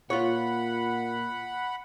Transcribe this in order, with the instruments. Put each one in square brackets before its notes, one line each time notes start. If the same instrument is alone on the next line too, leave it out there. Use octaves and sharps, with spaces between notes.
[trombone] A#2 [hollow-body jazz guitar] F4 C#5 [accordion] F#5 B5